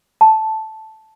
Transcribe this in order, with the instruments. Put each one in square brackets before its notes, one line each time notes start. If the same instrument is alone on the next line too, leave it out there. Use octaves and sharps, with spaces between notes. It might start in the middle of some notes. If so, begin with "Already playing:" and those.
[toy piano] A5